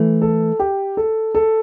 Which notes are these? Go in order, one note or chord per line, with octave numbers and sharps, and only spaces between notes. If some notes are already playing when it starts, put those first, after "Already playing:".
Already playing: E3 A3
A4
G4
A4
A4